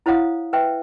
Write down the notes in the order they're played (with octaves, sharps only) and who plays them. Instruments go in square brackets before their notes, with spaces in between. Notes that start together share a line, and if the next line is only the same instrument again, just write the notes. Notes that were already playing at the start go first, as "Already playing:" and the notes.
[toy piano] E4 C5 C#5 F5 F#5 D#6
B4 C5 E5 G5